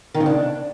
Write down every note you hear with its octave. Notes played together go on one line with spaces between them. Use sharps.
D#3
C#3
D4